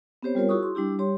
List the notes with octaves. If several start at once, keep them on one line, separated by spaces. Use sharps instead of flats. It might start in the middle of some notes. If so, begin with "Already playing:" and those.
B3 C4 G4 C5 C#5
G3 F4 A#4 C#5
E4 F#4 G#4 C#6 D#6
C6
G3 D4 E4 G4
G3 G4 C#5 C6